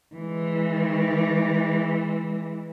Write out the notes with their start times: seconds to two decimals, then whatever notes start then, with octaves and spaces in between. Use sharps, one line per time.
0.15 E3 G#3